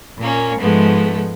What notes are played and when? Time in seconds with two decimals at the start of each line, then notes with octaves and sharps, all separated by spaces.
0.19 A#2 A#3 C#4
0.59 G#2 F3 G#3 A3 B3